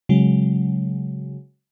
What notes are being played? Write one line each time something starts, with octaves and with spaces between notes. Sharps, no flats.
C#3 F#3 G#3